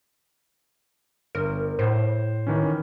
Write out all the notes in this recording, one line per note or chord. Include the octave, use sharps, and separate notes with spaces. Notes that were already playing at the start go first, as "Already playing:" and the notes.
G1 A#4
A2 C5
D#3 E3 C#4